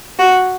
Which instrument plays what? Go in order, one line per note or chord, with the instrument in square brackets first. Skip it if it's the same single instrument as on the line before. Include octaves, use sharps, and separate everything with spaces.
[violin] F#4